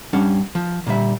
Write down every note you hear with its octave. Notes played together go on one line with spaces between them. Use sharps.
G2 G3 C#4 D4 F#5
F3
A#2 D3 G3 E5